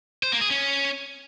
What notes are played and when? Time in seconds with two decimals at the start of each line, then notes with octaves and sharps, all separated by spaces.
0.23 C5
0.32 A#3
0.41 G#4
0.50 C#4